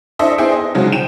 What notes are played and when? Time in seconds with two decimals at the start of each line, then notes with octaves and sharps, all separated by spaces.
0.19 D4 E4 A4 C5 D#5 E5
0.38 B3 D4 E4 G#4 C5 G5
0.52 D#5
0.75 C#3 F3 F#3 G#3 D#4 F#4
0.92 F3 G5 D#7 E7